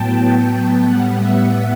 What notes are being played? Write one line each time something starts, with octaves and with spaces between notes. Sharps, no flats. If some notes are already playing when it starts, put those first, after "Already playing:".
Already playing: A2 F#3 B3 G5 A5
A5
G5
A2 G3 B3 F#5
E5